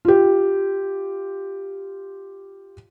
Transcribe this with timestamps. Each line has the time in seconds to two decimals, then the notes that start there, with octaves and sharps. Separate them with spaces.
0.05 F4 G4